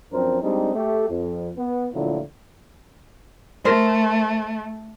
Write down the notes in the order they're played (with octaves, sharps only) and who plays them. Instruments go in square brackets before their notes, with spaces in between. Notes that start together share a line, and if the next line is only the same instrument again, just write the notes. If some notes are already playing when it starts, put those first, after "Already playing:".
[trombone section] F#2 F3 C4 D4 A#4 C5
G3 G#3 C4 D4 D#4
A3 G4
F2
B3
D2 A#2 D3 F3 F#3 E4
[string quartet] A3 [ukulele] A#4 C5